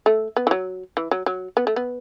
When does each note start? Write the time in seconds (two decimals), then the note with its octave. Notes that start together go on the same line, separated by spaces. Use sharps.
0.06 A3
0.36 B3
0.47 E3
0.51 F#3
0.97 E3
1.11 F#3
1.26 F#3
1.57 B3
1.67 A3
1.76 B3